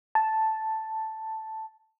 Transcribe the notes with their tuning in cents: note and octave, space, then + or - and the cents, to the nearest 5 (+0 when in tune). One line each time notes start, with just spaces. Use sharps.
A5 +0